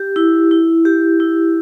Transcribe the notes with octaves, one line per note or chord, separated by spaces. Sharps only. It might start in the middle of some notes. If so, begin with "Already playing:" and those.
Already playing: G4
E4
E4
G4
E4